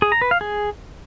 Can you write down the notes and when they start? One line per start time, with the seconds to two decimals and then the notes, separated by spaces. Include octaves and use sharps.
0.02 G#4
0.12 A#5
0.22 B4
0.31 F5
0.41 G#4